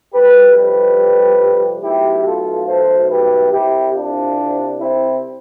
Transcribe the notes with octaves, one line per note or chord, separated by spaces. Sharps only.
F2 C3 G3 G4 B4
G4 B4
B1 B2 A3 E4 G4
F4 A4
A4 C5
G4 B4
C2 C3 G3 E4 G4
D4 F4
C4 E4